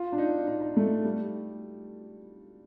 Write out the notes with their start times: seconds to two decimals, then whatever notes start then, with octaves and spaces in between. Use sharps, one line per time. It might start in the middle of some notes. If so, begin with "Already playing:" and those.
Already playing: F4
0.12 D4
0.18 D#4
0.47 D#4
0.61 D#4
0.77 A3
1.05 G3